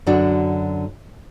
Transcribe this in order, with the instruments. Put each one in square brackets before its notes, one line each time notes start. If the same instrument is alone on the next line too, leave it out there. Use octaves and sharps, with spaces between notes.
[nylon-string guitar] F#2 D3 D4 F#4